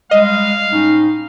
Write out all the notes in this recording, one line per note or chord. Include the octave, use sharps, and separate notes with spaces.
G3 G#3 D#5 F5
A2 C#4 D#4